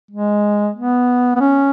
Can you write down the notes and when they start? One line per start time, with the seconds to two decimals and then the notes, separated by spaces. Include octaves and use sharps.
0.11 G#3
0.75 B3
1.36 B3
1.41 C#4